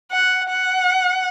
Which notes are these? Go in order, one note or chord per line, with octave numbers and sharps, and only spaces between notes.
F#5
F#5